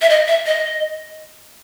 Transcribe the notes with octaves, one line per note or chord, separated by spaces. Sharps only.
E5
D#5
E5
D#5